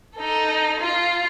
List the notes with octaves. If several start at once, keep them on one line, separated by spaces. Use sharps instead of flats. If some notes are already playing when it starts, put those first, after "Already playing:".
D#4 A4
F4